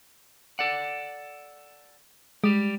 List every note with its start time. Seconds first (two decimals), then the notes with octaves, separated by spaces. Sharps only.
0.59 A4 D5 F#5
2.44 G3 G#3 G4